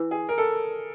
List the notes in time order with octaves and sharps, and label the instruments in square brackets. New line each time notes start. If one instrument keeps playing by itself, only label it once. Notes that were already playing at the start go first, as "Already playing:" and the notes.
Already playing: [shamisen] E3
[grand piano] G#4
A#4
A4